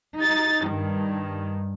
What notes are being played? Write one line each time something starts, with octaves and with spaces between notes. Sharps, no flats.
D#4 A6
G2 D#3